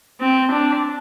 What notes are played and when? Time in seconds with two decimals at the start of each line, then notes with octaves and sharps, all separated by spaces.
0.21 C4
0.51 D4